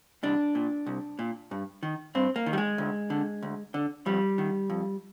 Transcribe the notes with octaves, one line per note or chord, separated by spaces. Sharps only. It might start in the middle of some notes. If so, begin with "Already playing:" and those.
C2 D4
A#2
C2
A#2
G2
D#3
G2 C4
A#3
D#3
G3
G#3
D2
D3
D2
D3
F2 G3
D#3
F2